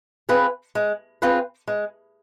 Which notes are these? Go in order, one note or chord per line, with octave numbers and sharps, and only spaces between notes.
C4 F4 G#4 B4
G#3
C4 F4 G#4 B4
G#3